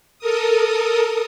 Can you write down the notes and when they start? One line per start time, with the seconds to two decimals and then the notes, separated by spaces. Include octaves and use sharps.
0.19 A4 A#4 D#6